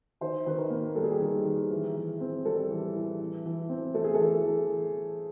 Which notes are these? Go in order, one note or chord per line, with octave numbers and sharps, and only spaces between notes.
D#3 C5
D#3 B4
A#4
A#3
G3 A4
G#4
G4
D#3 G#4
D#3
E3
E3
C4
G3 A4
E3
E3
E3
E3
C4
A3 A4
G#4
E3 A4
E3